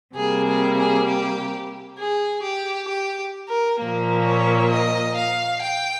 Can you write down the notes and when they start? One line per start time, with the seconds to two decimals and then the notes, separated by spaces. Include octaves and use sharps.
0.16 C3 G3 A#3 G#4
0.46 G#4
0.77 G#4
1.07 G4
1.99 G#4
2.43 G4
2.89 G4
3.50 A#4
3.79 A#2 F3 A#3
4.25 C#5
4.71 D#5
5.16 F5
5.62 G5